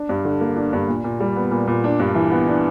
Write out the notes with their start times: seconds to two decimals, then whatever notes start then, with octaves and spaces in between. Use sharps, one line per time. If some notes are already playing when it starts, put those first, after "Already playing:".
Already playing: D4
0.09 G2
0.25 D3
0.41 A#3
0.56 D4
0.73 G2
0.88 A#2
1.04 A#2
1.20 G3
1.36 B3
1.51 A#2
1.67 A#2
1.84 D4
1.99 G2
2.15 E3
2.31 B3
2.47 D4